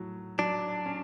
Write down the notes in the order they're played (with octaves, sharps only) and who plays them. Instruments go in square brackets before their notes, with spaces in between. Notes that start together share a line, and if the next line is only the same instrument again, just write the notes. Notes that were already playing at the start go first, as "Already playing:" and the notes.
Already playing: [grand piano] A2 F#3
[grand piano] F#3 [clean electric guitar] D4
[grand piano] C#4